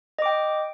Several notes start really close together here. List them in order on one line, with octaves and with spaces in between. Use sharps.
D#5 D6 G5